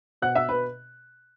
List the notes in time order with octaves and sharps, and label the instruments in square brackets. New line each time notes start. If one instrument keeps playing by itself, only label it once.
[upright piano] B2 F#5 F#6
E5 E6
B4 B5